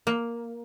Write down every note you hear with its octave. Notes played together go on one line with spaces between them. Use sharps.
A#3